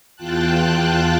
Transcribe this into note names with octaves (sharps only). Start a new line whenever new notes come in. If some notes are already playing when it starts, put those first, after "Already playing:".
E2 F4 G5 A5 F#6